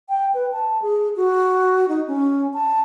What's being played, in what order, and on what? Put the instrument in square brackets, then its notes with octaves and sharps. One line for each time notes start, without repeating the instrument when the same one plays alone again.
[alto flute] G5
B4
A5
G#4
F#4
D#4
C#4
A5